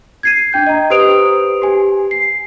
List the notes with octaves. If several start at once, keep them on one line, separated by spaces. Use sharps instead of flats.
G#6 C7 D#7
D4 G5 G6
D#5 A#5
G4 B4 C5 D#6 D7 F7
G4 G#5
C7